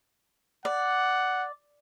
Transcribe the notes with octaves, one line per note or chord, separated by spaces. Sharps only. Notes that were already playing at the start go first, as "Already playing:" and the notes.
D5 F#5